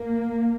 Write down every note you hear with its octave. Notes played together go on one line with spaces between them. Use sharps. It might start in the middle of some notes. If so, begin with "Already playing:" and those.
Already playing: A#3